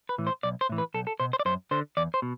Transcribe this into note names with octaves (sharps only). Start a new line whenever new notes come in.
B4
A2 E3
C5
B1 D5
C5
A2 E3
B4
B1 A4
A4
B2 C5
C5
D5
F#2 C5
D3 C5
E2 D5
C5
B2